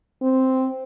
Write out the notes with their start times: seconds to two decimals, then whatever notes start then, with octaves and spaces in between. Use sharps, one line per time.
0.22 C4